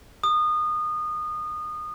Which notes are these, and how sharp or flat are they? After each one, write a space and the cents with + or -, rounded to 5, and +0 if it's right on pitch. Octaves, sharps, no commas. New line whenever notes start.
D#6 -25